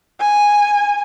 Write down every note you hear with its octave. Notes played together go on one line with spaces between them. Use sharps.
G#5